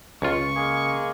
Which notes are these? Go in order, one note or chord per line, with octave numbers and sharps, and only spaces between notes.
C#2 C#3 F4 C#6
G#3 A#3 G#4